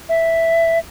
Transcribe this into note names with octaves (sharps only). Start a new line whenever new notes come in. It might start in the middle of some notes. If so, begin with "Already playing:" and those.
E5